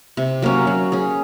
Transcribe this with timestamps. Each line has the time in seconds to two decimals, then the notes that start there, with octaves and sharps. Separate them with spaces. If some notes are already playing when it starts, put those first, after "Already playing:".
0.17 C3
0.42 F#3 A#3 C#4
0.67 F#3
0.92 C#4 G#4